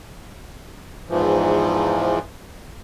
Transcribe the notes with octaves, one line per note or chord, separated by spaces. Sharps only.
E2 G#2 E3 F3